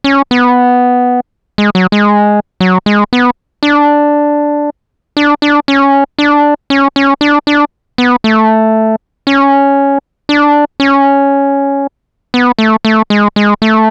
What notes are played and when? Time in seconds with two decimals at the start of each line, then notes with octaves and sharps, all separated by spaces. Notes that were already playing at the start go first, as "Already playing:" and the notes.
0.04 C#4
0.31 B3
1.58 G#3
1.75 F#3
1.92 G#3
2.60 F#3
2.86 G#3
3.13 B3
3.63 D4
5.17 D4
5.42 D4
5.68 C#4
6.19 D4
6.70 C#4
6.96 C#4
7.21 D4
7.47 D4
7.98 B3
8.24 A3
9.27 C#4
10.29 D4
10.80 C#4
12.34 B3
12.59 A3
12.85 A3
13.10 G#3
13.36 G#3
13.62 A3